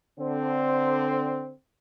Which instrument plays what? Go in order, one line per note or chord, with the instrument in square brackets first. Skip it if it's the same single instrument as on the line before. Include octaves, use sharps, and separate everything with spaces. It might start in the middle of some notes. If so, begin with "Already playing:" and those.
[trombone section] D3 C4